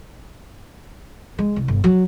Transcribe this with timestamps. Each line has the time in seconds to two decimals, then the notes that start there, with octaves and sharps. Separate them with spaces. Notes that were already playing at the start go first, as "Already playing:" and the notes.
1.38 G#3
1.56 C2
1.68 G1
1.84 F#3